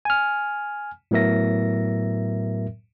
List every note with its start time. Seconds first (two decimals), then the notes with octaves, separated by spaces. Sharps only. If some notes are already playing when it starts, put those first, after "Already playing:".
0.05 G#5 F6
1.11 A2 F#3 B3 A#4 E5 A#6